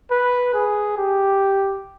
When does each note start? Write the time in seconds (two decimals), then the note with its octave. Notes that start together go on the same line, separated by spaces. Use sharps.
0.11 B4
0.54 G#4
0.97 G4